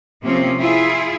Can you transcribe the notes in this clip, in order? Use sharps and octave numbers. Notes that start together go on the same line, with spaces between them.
C3 F3 A#3 C4 C#4
E4 F4 G#4